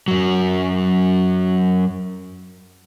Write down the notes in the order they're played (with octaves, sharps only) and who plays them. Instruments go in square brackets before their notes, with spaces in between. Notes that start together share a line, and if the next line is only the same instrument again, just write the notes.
[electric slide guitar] F#2 F#3